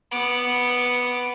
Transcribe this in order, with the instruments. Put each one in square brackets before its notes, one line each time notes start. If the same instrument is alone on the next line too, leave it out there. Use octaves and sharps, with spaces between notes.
[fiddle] B3 D6